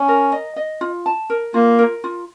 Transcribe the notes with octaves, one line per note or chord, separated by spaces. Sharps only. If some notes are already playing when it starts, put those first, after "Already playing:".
Already playing: C#4
A#4
D#5
D#5
F4
A5
A#4
A#3 F4
A#4
F4